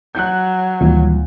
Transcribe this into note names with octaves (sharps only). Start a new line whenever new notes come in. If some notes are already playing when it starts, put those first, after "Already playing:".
F#3 F#6 G6
D2 A#2 D#3 E3 G3